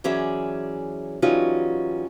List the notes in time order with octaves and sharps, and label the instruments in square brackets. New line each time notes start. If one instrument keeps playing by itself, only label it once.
[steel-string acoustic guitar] E3 F#3 C#4 G#4 D5 E5
E3 F#3 G3 C#4 D#4 F4